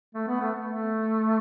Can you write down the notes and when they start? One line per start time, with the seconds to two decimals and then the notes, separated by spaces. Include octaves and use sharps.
0.14 A3
0.28 B3
0.41 A3
0.69 A3